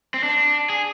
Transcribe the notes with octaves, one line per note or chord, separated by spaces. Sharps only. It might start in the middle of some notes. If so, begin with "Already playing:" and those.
C4
D4
G#4